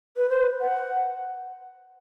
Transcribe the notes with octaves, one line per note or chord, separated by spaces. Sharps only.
B4
C5
B4
F#5